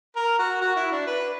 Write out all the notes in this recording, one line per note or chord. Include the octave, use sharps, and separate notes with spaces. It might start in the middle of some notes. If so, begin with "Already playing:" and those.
A#4
F#4
F#4
E4
D4
B4